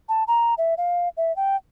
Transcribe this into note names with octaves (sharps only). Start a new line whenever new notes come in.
A5
A#5
E5
F5
E5
G5